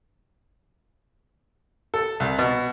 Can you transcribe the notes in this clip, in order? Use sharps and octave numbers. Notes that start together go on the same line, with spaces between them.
A4
C2
B2